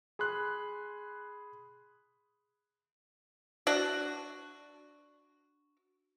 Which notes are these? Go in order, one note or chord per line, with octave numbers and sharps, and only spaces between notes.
G#4 B5 C6 F#6
D4 F#4